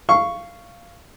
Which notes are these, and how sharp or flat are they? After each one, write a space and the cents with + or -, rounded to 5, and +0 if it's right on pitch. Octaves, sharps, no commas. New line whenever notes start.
F5 -15 C#6 +0